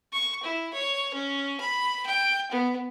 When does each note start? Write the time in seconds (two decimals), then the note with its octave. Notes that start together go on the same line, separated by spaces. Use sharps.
0.13 C#6
0.43 E4
0.73 C#5
1.14 C#4
1.60 B5
2.06 G5
2.51 B3